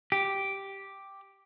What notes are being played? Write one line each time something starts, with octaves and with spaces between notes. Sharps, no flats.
G4